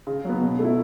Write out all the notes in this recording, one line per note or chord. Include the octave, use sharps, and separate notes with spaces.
C#3
F#3 B3
B2
A3
E4